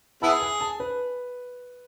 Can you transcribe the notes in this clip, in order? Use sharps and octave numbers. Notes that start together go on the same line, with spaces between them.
B3 E4 G#4 A5
G#5
A5
B4